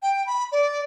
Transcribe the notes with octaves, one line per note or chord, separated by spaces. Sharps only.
G5
B5
D5